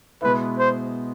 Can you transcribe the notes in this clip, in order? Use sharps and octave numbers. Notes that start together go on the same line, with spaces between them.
B2 G#3 B3 E4 B4
C5